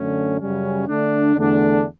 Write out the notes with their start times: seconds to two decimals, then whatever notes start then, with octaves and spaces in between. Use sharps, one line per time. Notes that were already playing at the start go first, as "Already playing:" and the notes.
Already playing: F#2 D3 A3 C#4
0.39 F#2 C#3 G3 C#4
0.87 D3 A3 D4
1.36 E2 D3 A3 D4